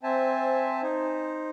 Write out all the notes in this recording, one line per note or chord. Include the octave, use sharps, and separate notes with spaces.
C4 C5 E5 G#5 A5
D#4 C5